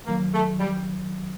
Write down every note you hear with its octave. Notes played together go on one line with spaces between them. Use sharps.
F#2 D#3 F#3 A#3
A3
G3